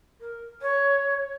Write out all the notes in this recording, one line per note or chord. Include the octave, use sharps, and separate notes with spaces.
A#4
C#5